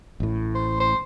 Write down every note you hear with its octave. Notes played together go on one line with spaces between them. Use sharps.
A1 A2
C5
C5